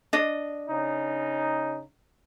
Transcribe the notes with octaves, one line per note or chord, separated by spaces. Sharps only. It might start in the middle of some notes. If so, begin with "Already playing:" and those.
D4 D#5
C#3 D#4